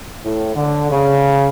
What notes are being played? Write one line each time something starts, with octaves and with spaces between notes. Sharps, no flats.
A2
D3
C#3